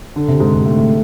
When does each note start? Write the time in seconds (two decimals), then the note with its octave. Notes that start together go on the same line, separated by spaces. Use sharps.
0.16 D3
0.28 C3
0.40 G#2
0.53 G#2
0.66 A2
0.78 A2